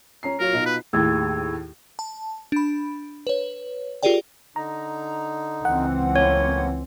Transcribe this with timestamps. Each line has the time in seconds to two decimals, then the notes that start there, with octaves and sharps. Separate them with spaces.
0.23 C#4 A#5 C7
0.40 F#3 F4 A#4 C#5
0.53 B2 D#4 F4
0.66 B4
0.93 D#2 A2 G#4 E6 G#6
1.99 A5
2.52 D4 B5
3.27 B4 C#5
4.03 F4 G4 G#4 A#4 D5 G5
4.56 D3 D#4 A#5
5.65 C#2 E3 C4 F#5
6.16 A2 A#3 C#4 C#5